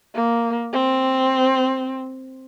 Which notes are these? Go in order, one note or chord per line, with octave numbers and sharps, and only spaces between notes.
A#3
C4